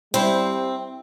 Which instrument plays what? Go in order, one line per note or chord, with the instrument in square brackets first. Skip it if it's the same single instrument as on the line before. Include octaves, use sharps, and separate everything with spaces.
[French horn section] G3 [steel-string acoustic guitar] C4 [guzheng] E4 C5